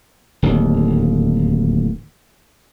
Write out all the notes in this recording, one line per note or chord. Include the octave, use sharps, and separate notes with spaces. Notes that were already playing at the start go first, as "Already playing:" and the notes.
D1 D#2